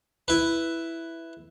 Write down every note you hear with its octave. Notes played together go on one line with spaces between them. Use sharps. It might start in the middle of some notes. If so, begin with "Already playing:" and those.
E4 B4